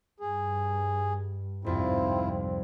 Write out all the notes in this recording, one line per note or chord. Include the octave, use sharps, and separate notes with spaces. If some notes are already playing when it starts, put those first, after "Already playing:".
G2 G#4
C2 F2 G#2 C4 E4 F4